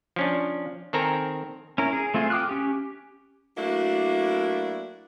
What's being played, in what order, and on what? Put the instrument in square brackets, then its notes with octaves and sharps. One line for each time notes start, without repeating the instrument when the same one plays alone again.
[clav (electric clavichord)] F3 C#4 D4
D#3 C4 A4 A#4 G#5 A#5
[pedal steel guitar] C#4 E4 A#4
G#4
A3 C4 F4 G#4
G5 D6 D#6 F6 F#6
C#4 G4
[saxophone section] F#3 A3 A#3 D4 E4 F#4